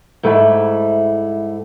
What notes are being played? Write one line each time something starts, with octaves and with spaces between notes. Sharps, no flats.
G#2 G3 A3 E4